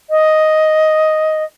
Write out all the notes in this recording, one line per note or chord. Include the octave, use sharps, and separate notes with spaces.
D#5